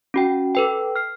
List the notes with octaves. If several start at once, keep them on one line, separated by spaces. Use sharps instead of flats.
C#4 F#4 G5
A4 B4 G5
F6 C7